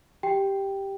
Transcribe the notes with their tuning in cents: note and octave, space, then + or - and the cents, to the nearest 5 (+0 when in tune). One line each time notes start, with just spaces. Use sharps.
G4 +0 G5 +0